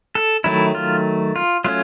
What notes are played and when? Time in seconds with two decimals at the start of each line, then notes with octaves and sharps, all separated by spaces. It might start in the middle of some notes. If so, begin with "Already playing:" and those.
0.15 A4
0.44 D#3 F#3 A3 E4
0.75 F4
1.36 F4
1.64 F#3 A3 C#4 F4